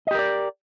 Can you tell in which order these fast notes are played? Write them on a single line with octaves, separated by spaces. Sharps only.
D#5 G4 A#4 D5